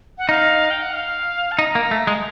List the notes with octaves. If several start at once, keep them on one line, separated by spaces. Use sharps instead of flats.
F#5
D#4 F5
G5
F#5
F5
A5
D#4 A#5
A#3
A3
G#3